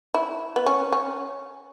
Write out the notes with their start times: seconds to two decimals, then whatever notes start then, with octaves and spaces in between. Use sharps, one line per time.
0.14 E4
0.56 B3
0.66 C#4
0.92 C#4